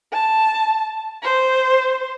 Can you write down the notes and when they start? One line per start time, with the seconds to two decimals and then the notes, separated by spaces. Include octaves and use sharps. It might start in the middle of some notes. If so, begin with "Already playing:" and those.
0.12 A5
1.23 C5